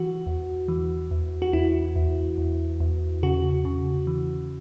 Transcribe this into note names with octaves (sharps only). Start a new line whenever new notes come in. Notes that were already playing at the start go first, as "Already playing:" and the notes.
Already playing: E3 F#4
E2
E3
E2
F#4
E2 E4
E2
E2
E2
C#3 F#4
C#3
E3